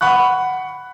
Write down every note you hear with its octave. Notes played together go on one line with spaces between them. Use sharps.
F#5 B5 C#6 F#6